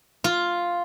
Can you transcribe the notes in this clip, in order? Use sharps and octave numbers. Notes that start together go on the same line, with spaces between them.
F4